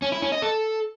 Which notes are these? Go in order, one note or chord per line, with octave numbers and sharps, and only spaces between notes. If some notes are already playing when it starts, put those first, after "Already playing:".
C#4
E4
C#4
D#5
A4